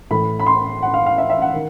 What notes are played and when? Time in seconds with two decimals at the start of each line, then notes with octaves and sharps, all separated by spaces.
0.11 A2 E3 A3 B5
0.40 B5
0.47 C6
0.82 F#5
0.94 F5
1.06 F5
1.18 E5
1.30 E5
1.42 F#5
1.53 D#3